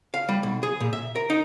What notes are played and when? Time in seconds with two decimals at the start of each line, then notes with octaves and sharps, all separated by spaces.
0.14 F5
0.29 G3
0.43 B1
0.63 G#4
0.80 A#2
0.93 E5
1.16 A#4
1.30 D#4